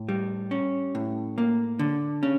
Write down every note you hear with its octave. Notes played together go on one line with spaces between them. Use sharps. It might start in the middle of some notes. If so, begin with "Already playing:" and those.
Already playing: A2
G3
C#4
A2
A#3
D3
C#4